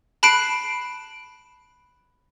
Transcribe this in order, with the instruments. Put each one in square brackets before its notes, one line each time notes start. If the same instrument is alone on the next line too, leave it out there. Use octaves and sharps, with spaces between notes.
[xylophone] A5 B5 F#6 C7 D7